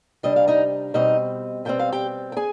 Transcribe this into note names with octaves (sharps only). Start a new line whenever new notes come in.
C3 G3 D4 D#5
F5
D#4 D#5
B2 G3 C4 D#4 D#5
B2 G3 C4 G5
F5
G4 G5
G5
G#4 G#5